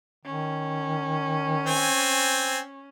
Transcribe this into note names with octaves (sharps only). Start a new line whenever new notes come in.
D#3 C#4
C4 G#5